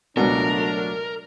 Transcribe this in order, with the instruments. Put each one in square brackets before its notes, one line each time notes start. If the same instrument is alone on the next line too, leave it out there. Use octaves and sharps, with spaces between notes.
[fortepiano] C#2 B2 [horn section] F#3 A3 D4 [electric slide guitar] A#4